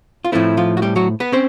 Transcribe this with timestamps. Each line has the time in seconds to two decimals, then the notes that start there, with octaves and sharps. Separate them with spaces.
0.25 F4
0.32 A2 F3 A3 C4 E4
0.57 F3 F4
0.77 F#4
0.82 G3 G4
0.96 F#3 F#4
1.20 B3 B4
1.32 C4 C#4 C5